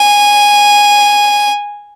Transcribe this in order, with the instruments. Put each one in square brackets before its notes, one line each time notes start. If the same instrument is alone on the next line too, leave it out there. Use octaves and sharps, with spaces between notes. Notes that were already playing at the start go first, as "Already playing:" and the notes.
Already playing: [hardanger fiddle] G#5